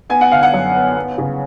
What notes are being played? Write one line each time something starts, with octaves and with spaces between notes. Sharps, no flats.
B3 G#5
F#5
D3 F5
F#5
F#2
B3
B3
C#3